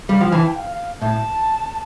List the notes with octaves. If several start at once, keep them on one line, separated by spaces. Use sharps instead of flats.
G3 F5
F3 G5
E3 A5
G5
F5
F5
A2 A5